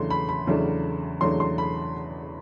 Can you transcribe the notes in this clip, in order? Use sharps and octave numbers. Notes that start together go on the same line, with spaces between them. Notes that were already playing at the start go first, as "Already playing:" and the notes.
Already playing: E2 C#3 F#3 A3 D4 C6
B5
B5
E2 C#3 F#3 A3 D4
E2 C#3 F#3 A3 D4 C6
C6
B5